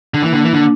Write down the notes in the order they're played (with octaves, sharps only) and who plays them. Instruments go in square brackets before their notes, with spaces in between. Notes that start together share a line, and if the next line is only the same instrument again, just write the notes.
[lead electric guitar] D3
[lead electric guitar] E3 [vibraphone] A#3
[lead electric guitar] D3
E3
[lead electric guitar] D3 [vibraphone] D4